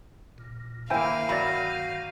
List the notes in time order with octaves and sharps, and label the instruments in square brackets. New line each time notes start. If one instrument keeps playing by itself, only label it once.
[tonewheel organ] A#2
[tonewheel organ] G2 D#3 [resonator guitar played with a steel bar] A#3 E4 [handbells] C5 G5 G#5 [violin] F5
[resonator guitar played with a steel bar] F#3 [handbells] D5 B5